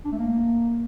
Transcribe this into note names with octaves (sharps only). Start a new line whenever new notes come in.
D4
A3
A#3